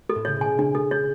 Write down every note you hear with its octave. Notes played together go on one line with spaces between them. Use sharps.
A4
A2
C#3 C#5
B2 G#5
C#3 D4
A4
C#5